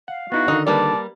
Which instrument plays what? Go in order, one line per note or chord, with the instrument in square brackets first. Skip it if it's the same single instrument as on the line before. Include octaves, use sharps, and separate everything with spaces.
[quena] F5 [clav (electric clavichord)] F#5
[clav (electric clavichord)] B3 D#4 E4 [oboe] F#4
[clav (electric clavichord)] D3 D#3 [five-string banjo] D#4
[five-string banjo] G3 A#3 B4 [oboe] D5 [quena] A5